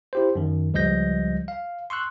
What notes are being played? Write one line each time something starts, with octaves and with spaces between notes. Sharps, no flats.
E4 G4 C5
F#2 D#3
C#2 F3 G3 D#5 G6 A#6
F5
C6 C#6 E6 F#6